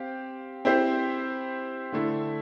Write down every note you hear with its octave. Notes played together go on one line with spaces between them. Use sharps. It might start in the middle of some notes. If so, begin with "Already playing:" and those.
Already playing: C4 G4 F5
C4 E4 G4 C5
D3 A3 E4